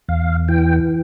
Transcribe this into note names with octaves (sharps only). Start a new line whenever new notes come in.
E2 F5
E3 G5